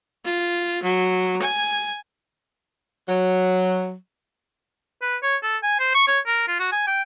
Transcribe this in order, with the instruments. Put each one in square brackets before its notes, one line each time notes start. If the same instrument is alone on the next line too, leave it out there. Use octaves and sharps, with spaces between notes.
[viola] F4
F#3
G#5
[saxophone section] F#3
[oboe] B4
C#5
A4
G#5
C5
C#6
C#5
A#4
F4
F#4
G#5
G5